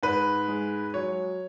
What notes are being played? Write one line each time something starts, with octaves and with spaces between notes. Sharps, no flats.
G#2 B4
G#3
F#3 C#5